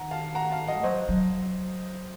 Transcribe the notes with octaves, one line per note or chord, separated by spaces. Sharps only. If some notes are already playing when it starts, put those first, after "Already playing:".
Already playing: D#3 F#5 A#5
F5 A5
F#5 A#5
F5 A5
D#5 F#5
A3
F#3 C5 D#5
F#3